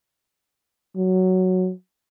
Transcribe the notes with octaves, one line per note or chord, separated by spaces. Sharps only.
F#3